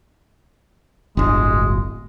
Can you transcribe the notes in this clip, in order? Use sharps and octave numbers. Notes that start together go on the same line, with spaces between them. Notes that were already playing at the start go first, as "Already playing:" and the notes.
D1 G1 G#3